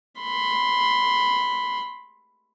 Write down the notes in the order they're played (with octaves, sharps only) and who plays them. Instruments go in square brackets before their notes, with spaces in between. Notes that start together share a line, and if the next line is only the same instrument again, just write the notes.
[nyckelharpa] B5 C6